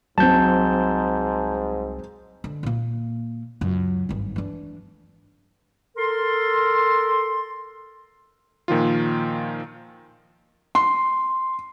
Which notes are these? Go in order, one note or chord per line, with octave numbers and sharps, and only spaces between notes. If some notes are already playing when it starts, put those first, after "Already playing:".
C2 G#2 F#3 C4 A5 G6
D3
A#2 A#3
C#2 F#2
G#1 G2
E3 D4
A4 A#4 C6
A#2 D#3 F3 F4
C6